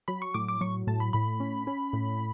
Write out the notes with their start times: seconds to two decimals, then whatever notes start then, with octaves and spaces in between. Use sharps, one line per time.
0.08 F#3 B5
0.22 C#6
0.34 A2 D6
0.48 D6
0.61 F#3 C#6
0.87 A2 A5
1.00 B5
1.13 A2 B5
1.40 C#4
1.67 C#4
1.93 A2